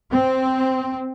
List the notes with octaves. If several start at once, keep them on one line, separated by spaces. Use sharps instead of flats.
C4